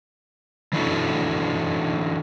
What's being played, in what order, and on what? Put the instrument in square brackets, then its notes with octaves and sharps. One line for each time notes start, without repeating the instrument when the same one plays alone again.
[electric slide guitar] E3 D4 E4 F#4 A4